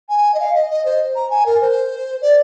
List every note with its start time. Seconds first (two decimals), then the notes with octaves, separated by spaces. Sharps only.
0.09 G#5
0.34 D#5
0.39 F5
0.54 D#5
0.70 D#5
0.85 C5
1.15 A#5
1.30 G#5
1.46 A#4
1.61 C5
2.21 D5